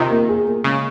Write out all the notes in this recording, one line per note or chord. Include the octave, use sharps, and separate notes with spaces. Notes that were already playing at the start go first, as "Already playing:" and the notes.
Already playing: C3 D#3 F4
A#3
G#4
A#3
C#3 G#3